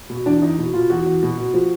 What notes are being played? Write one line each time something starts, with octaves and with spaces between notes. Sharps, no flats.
B2
E2 D4
E2 D#4
B2
B2 F4
E2 F#4
E2
B2
B2
F3